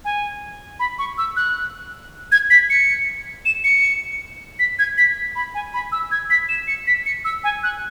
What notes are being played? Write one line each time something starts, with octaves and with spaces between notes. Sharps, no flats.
G#5
B5
C#6
E6
F#6
G#6
B6
C#7
E7
C#7
B6
G#6
B6
B5
G#5
B5
E6
G#6
B6
E7
C#7
B6
C#7
E6
G#5
F#6